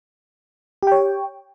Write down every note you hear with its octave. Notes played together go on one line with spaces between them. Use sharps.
G4 C#5 G5